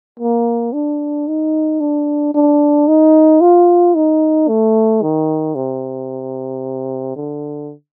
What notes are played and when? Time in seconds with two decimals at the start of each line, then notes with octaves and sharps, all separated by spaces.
0.20 A#3
0.73 D4
1.27 D#4
1.81 D4
2.34 D4
2.88 D#4
3.41 F4
3.95 D#4
4.48 A3
5.02 D#3
5.55 C3
7.16 D3